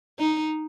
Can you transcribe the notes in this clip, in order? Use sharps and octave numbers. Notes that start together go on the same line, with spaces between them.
D#4